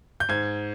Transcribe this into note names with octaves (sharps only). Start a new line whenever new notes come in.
G6
G#2 G#6